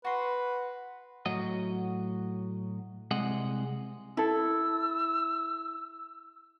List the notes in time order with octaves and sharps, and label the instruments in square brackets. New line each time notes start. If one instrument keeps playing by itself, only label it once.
[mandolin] F#4 C6 [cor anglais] B4
[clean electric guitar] A2 F#3 F#4 D#5
C2 C3 G#3 D#5 F#5
[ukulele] E4 A4 [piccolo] E6